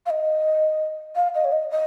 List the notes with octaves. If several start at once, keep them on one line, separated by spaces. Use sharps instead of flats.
F5
D#5
F5
D#5
C#5
D#5
D#5